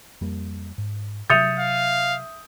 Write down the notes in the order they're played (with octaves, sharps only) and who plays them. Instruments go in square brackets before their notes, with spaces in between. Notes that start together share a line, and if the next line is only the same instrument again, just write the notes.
[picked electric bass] F2 G3 A#3
G#2
[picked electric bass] C3 F#3 [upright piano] E5 D#6 G6 [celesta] A6 C#7 F7
[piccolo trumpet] F5